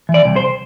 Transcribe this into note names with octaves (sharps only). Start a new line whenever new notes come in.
E3
D5
C2
C5